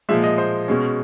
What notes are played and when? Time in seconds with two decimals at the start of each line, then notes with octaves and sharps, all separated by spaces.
0.09 A#2 F3 G#3 E5
0.24 D#5
0.38 C5
0.68 B2 G#3 C#4